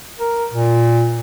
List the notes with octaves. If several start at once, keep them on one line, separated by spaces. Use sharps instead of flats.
A#4
A#2